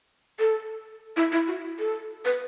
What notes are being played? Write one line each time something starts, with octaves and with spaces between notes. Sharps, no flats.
A4
E4
E4
F#4
A4
B4